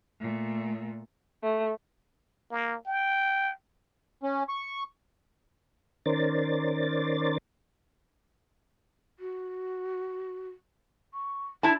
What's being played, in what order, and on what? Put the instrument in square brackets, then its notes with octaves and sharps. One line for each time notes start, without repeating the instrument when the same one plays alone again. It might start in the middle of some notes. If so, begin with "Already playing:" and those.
[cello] A#2 A3
[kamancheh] A3
[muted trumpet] A#3
G5
[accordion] C#4
C#6
[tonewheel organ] D#3 C#4 A#4 C5 D5 A6
[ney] F#4
C#6
[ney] D4 [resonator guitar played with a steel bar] E4 A5